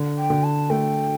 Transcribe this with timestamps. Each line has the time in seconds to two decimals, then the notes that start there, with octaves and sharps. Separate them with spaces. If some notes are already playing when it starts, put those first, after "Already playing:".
Already playing: D3
0.17 G5
0.30 D3
0.43 A5
0.69 A3 G5